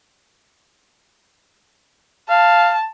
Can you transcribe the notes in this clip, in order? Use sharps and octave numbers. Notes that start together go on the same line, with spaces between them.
F5 A5